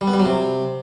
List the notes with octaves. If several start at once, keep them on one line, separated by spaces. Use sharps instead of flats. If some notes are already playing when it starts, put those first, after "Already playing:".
G3
B3
G3
F#3
C3